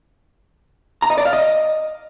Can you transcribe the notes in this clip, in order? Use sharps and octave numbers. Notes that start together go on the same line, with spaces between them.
A#5
D#5
D5
F5
D#5